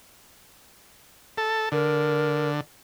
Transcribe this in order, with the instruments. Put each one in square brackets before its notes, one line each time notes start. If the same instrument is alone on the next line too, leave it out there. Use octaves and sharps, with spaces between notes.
[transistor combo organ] A4
[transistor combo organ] D3 [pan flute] A#4